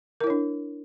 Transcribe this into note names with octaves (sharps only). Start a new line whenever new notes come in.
D4 E4 A#4 C#5